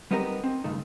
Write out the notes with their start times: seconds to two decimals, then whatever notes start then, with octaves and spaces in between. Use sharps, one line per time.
0.11 G3 B3 C4 D#4 G4 A#4
0.44 C4
0.64 C#2 G2 D#3 A3 D#4